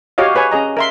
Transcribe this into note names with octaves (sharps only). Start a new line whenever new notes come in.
F#4 G4 C#5 D#5 F5
G#4 B4 C#5 G#5
C#4 G#4 D#5 A#5
A#4 E5 C6